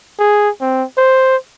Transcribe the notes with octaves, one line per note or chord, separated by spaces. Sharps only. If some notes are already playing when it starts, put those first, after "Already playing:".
G#4
C4
C5